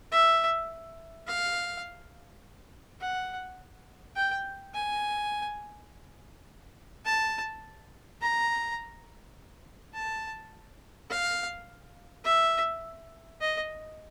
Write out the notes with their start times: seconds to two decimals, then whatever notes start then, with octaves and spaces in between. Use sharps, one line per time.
0.11 E5
1.27 F5
3.01 F#5
4.16 G5
4.74 G#5
7.05 A5
8.21 A#5
9.94 A5
11.10 F5
12.24 E5
13.41 D#5